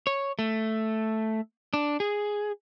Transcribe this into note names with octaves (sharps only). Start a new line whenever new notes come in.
C#5
A3
D4
G#4